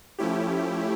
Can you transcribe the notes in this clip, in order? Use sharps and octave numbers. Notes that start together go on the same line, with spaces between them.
F3 A3 C#4 E4 G4